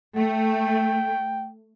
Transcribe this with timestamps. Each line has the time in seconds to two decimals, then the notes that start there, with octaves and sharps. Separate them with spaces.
0.17 A3 G5